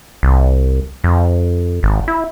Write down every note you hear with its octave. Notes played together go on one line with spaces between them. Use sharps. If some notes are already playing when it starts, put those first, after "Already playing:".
C2
F2
G#1
E4